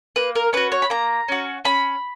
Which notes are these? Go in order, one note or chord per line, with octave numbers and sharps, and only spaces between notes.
A#3 B4
A#4
C#4 F#4 B4
C#5
B5
A#3 A#5
C#4 F#4
C#4 B5